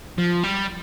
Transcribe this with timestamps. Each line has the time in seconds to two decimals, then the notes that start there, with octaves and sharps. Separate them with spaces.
0.18 F3
0.43 G3